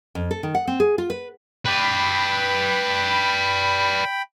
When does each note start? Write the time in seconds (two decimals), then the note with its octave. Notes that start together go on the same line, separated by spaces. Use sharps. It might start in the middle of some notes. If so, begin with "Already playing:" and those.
0.15 F2
0.31 A4
0.43 D#3
0.55 F#5
0.67 C4
0.80 G#4
0.98 F4
1.10 B4
1.66 B4 D5 G5 B5